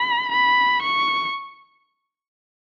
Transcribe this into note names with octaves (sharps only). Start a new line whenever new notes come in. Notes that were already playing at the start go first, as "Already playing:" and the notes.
Already playing: B5
B5
C#6